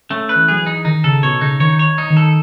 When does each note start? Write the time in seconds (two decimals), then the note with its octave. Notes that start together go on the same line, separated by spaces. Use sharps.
0.10 A3 C#4
0.29 B4
0.36 E3
0.48 F#3 G#4
0.61 E3
0.66 D#4
0.85 D#3 D#4
1.04 C#3 A4
1.23 B2 C#5
1.41 C#3 D#4
1.60 D#3 C#5
1.79 C#5
1.98 D#4
2.10 D#3
2.17 A4